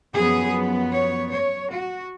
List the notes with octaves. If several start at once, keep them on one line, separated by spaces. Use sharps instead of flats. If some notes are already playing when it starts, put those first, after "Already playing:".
F#2 F3 B3 G#4
C#5
C#5
F#4